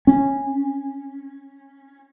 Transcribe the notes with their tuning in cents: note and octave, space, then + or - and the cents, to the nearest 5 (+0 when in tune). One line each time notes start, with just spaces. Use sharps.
C#4 -10